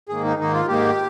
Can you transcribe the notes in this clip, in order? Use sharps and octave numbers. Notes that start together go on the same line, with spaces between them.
G#2 D#3 A#3 G#4
D#4
G#2 D#3 A#3 D#4
F4
G#2 D#3 A#3 G4